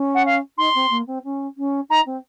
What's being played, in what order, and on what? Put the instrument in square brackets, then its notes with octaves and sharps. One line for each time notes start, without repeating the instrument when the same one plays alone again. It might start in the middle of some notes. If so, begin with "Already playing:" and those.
Already playing: [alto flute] C#4
[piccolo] F#5
F5
[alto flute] D#4 [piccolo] C6
[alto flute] C4
A#3
C4
C#4
C#4
[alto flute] D#4 [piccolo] A#5
[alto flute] C4